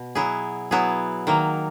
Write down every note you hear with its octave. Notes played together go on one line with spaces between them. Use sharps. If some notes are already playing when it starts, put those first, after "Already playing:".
Already playing: B2
F#3 B3 E4 G#4
F#3 B3 E4 G#4
D#3 F#3 A#3